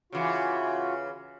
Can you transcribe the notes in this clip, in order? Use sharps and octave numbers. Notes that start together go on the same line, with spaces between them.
C#3 E3 F4 F#4